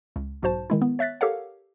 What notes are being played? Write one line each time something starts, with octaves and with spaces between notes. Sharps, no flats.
C#2
B1 G#2 F#4 C5 A5
D#3 G#3 E4
B3
C#5 E5 F#6 A6 B6
G4 A4 A#4 C#5 F5 F#5